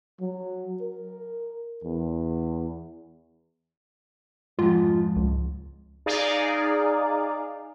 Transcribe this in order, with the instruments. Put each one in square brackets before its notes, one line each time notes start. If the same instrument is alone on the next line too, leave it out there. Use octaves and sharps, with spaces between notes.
[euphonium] F#3
A#4
E2
[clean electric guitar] F2 G#2 [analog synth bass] F4
[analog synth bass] C#2
[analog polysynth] D#4 G#4 D5 F5